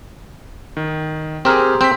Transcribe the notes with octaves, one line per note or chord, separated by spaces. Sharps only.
D#3
C4 G4 G#4 A#4
C4 G6 B6